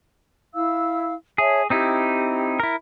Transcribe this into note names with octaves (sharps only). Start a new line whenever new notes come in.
E4 F5 E6
G#4 C#5 E5 A5
C4 D#4 E4 G4
E4 A#4